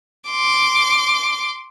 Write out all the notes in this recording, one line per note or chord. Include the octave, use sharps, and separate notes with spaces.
C6 D6